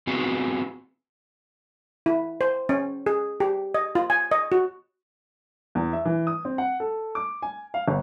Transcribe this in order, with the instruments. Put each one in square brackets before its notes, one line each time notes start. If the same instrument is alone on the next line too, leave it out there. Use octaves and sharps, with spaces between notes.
[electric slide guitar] B3 C4 F4 F#4 G#4
[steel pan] E4
C5
C#4
G#4
G4
D#5
F4
G#5
D#5
F#4
[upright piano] E2
E5
E3
D#6
C4
F#5
A4
D6
G#5
F5
G1